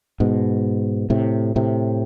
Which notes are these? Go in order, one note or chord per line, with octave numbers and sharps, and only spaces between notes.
G#2 B2
A2 C3
A2 C3